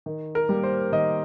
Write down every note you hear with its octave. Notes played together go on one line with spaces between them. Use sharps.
D#3
A#4
G3 A#3
C5
D#3 D#5